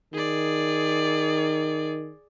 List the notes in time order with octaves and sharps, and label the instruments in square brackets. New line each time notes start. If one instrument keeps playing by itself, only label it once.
[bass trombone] D#3 [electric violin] G#4 D5